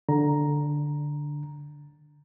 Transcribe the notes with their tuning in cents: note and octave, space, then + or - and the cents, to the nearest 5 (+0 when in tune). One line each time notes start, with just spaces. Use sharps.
D3 +0 A#5 +5